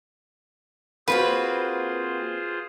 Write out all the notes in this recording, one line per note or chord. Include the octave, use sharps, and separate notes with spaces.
A#3 C4 F4 F#4 G#4 B4 C5